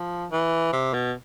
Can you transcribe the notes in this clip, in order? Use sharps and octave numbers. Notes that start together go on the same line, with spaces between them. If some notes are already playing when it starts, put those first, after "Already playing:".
Already playing: F3
E3
C3
B2